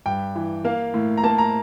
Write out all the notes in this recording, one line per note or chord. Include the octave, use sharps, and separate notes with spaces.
G2 G5
E3
A#3 F5
A2
A#5
A#3 A5
A#5